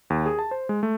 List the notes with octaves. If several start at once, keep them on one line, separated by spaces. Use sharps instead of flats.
D#2
G#4
A5
C5
G#3
A3